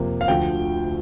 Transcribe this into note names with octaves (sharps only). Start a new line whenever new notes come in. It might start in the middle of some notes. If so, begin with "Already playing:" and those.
Already playing: F2 C3 A#3 F4
F5
D2 D3 F3 G5